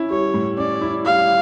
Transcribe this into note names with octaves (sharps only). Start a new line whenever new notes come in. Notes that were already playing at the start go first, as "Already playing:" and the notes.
Already playing: C#4 E4
G3 C#5
A2
C#4 D5
E4
G3 F5